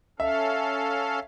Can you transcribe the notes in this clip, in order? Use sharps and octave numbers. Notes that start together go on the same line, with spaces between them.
C#4 A4 E5 F5